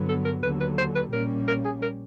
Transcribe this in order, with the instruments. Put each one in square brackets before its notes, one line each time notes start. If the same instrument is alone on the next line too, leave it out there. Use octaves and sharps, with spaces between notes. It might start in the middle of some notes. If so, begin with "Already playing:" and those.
Already playing: [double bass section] G2 D3 F#3 B3
[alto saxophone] A4
A#4
[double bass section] D#2 D3 F#3 [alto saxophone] B4
[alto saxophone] B4
C5
B4
[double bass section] A#1 A#2 G3 A#3 C#4 [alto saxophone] A#4
[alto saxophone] A#4
G#4
A#4